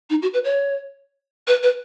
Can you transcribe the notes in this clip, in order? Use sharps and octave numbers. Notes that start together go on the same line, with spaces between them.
D#4
F#4
B4
C#5
B4
B4